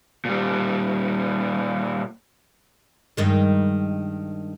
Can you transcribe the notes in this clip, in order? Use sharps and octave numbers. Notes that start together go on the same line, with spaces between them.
A#2 G3
G2 D#3 G#3